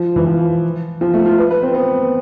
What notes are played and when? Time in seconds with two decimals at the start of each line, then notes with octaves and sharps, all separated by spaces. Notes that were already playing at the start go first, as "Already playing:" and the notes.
Already playing: F3
0.16 E3
0.26 F3
1.01 F3
1.14 A3
1.26 F4
1.38 B4
1.51 B4
1.62 C4
1.75 B3